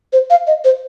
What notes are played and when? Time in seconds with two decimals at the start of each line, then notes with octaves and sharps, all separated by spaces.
0.13 C5
0.30 F5
0.47 D#5
0.65 C5